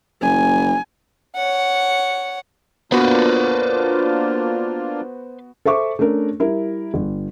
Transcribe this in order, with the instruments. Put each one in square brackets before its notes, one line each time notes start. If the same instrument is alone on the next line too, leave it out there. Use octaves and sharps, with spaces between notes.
[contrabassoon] F#1 [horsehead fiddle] G#5
[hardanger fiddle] C#5 F#5
[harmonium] A#3 D4 F4 [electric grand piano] B3 F#4 [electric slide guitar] B4 C5
[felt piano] A4 C5 E5 C#6 D6
A3 C#4 D4 A#4
G3 E4 A#4
G1